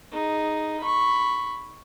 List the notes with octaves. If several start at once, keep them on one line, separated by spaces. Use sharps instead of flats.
D#4 G#4
B5 C#6